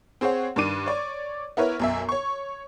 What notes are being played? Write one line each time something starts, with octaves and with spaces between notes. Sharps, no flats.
C4 G#4 C5 C#5 F#5
G2 D#3 D4 D6 D#7
C#5 D5 C#6
B3 E4 A#4 B4 C#5
B1 F#2 E5
C#5 C#6